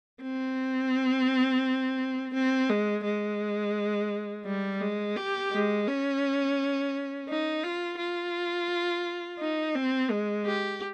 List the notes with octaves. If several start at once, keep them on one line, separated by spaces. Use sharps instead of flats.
C4
C4
G#3
G#3
G3
G#3
G4
G#3
C#4
D#4
F4
F4
D#4
C4
G#3
G4